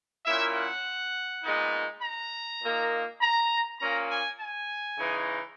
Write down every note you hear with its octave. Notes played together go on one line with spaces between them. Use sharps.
A#2 A#3 C#4 E4 E5
F#5
A#2 G#3 B3 D#4
A#5
A#2 A#3 D#4
A#5
A#2 A#3 C#4 A#5
G#5
G#5
C#3 E3 G#3 D#4